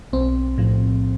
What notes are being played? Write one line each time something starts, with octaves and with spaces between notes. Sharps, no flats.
B1 C4
A2 F3